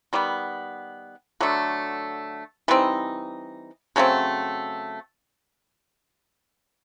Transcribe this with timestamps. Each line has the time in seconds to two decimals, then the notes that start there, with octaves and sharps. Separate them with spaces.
0.13 D#3 G3 B3
1.40 D3 F#3 A3
2.68 E3 G3 C4 D#4
3.96 C#3 F#3 A3 C4